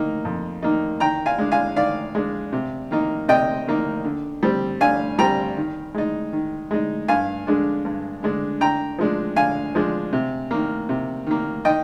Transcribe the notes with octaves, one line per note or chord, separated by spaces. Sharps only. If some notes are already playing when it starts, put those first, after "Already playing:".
Already playing: D#3 A#3 D#4
F2
D#3 A#3 D#4
D#3 G5 A#5
F5 G#5
G#3 D4
F5 G#5
D#3 D5 F5
G#3 D4
C3
D#3 A#3 D#4
C3 D#5 G5
D#3 A#3 D#4
D3
G3 C4
D3 F5 G#5
G3 C4 G5 A#5
D#3
G#3 D#4
D#3
G#3 D#4
G2 F5 G#5
D3 G#3 D4
G2
D3 G#3 D4
D3 G5 A#5
F3 G#3 D4
D3 F5 G#5
F3 G#3 D4
C3
D#3 A#3
C3
D#3 A#3
D#3 D#5 G5